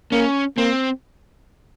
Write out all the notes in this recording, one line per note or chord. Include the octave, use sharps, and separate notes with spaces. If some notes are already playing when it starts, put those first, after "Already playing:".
A#3 C#4
A#3 C4